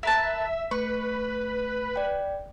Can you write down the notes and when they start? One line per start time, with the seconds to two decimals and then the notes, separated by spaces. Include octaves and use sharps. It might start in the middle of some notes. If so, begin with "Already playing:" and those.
0.03 A#4 B4 E5 A5
0.71 A3 B4 C#6
1.96 D5 G5